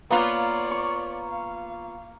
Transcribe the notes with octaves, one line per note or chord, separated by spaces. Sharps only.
A#3 B3 F4 C#5 D5
C#6
F5